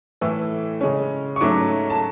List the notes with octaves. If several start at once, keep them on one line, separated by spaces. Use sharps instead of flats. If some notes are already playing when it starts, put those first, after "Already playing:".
A2 E3 A3
C#3 G#3 C#4
C#6
G#2 F#3 A3 C#4 D6
A5